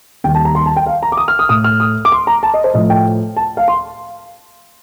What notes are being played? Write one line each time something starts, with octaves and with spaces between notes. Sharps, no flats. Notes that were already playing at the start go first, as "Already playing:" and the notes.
D#2 D#3 G3 G5
A5
A#5
C6
A5
G5
F5
A#5
D6
D#6
F6
D#6
A2 A3 D#6
F6
D#6
D6
C6
A#5
A5
D#5
C5
A2 F3 A3 D#5
G5
A5
F5
C6